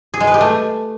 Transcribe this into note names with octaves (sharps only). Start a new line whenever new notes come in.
G#4
G#3
B4
G4
A3